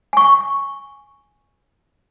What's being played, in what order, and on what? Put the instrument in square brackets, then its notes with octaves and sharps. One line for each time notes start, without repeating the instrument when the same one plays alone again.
[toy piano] G#5 C#6